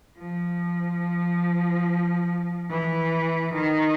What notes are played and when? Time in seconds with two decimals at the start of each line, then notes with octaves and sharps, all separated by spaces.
0.18 F3
2.70 E3
3.54 D#3